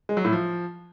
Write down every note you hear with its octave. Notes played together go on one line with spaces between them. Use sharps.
G#3
F#3
A2
F3